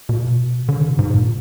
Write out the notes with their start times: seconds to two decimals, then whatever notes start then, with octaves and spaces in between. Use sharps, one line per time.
0.09 B2
0.69 D3
0.80 D#3
0.89 B2
0.99 G#2
1.14 A#2